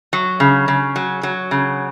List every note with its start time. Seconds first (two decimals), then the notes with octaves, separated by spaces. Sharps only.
0.13 F#3
0.40 C#3
0.68 C#3
0.96 F#3
1.23 F#3
1.51 C#3